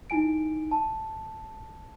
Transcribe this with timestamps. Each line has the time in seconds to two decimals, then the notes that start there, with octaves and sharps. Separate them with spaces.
0.10 D#4 E4 G#5 D7
0.71 A5